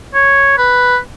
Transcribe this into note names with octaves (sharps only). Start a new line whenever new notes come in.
C#5
B4